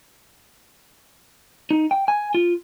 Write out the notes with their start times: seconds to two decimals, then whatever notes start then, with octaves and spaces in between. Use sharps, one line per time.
1.71 D#4
1.91 G5
2.08 G#5
2.34 F4